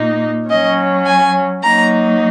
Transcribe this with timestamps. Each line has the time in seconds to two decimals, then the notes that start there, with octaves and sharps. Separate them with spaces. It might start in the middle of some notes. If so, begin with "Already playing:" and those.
Already playing: A#2 A#3 D#4
0.49 F#3 C#4 D#5
1.06 G#5
1.63 F#3 A#3 D#4 A#5